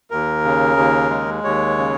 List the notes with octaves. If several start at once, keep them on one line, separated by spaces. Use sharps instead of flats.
D#2 A#4
C#3
D#2
G#3
D#2 C#5
C#3